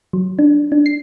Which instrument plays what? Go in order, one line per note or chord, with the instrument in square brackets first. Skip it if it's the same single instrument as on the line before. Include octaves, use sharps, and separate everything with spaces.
[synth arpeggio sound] F#3
D4
D4
C7